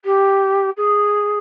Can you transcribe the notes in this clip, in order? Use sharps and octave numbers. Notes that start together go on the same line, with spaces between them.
G4
G#4